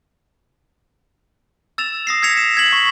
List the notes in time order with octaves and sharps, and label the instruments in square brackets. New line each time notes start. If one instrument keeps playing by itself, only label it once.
[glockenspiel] E6 A6 E7 F7
D#6 A#6 C7
E6 G#6 B6 C#7 F7
E7
G#6 B6 F#7
C#6